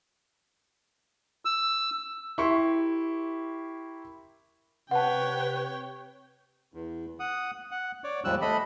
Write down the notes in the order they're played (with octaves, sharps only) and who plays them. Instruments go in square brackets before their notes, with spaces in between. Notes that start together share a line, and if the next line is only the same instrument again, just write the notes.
[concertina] E6
[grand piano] E4 G4 A#4 E5 C6 C#6
[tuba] C3 [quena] B4 [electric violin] C#5 G5 [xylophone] F#5 A5
[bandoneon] E2
F#5 D#6
F#5
C#5 D5
D#2 G#2 F3 G3 E6 F#6
A3 A4 D#5 B5